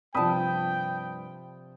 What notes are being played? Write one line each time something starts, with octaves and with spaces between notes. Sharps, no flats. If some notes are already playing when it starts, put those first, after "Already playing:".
G2 C3 F3 G5 A5 B5 D#6